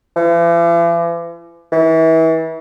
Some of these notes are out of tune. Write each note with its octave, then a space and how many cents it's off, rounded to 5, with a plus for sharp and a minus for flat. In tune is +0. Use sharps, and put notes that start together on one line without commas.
E3 +45
E3 -30